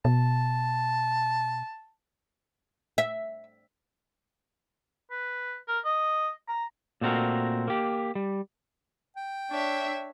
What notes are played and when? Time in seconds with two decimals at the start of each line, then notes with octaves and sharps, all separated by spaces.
0.05 B2 A5
2.98 E5
5.11 B4
5.68 A#4
5.85 D#5
6.48 A#5
7.01 A#2 A3 C4 F#4 A#4
7.68 A#3 G4
8.15 G3
9.17 G5
9.50 D4 C#5 E5